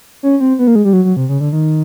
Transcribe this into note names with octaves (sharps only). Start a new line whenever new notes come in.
C#4
C4
B3
A#3
G#3
G3
F#3
F#3
C3
C#3
D3
D#3